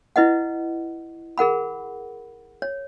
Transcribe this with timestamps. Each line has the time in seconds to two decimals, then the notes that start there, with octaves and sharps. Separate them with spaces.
0.16 E4 B4 D#5 F#5
1.38 G#4 A#4 F#5 B5
2.62 C#5